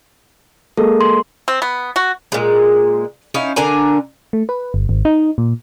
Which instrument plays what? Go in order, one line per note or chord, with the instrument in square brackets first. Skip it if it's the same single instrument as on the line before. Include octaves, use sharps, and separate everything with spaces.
[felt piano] G#3 A#3 [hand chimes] A4
[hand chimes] C6
[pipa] C4
B3
F#4
[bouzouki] A#2 G#3
C#4 D#4 E4 F5
D3 D4 A#4 G#5
[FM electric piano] A3
B4
G1
G#1
D#4
A#2